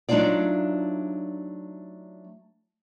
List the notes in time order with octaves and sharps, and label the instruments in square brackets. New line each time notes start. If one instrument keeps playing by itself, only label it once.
[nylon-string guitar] F#3 A3 D4 D#4 F4 D5